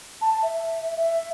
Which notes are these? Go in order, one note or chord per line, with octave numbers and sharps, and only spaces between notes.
A5
E5
E5